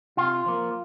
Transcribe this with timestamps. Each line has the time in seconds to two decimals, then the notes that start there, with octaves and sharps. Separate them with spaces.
0.17 C3 F4
0.46 F3 A#3